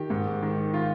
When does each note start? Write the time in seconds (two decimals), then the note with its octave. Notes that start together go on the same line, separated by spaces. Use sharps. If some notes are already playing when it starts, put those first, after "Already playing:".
Already playing: D#3 G4
0.10 G#2
0.42 D#3
0.74 D#3 F4